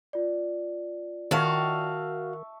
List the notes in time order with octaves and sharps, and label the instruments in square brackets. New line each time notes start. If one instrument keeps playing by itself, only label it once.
[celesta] F4 D5
[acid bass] D#3 [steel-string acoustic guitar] F#4 F5 [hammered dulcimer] E5 A5 C#6